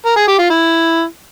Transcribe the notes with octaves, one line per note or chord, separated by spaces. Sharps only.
A#4
G#4
G4
F4
E4